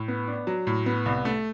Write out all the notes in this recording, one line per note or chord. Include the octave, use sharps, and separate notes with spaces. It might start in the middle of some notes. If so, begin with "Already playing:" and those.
Already playing: A2
B3
D4
F#3
A2
B3
C2
A3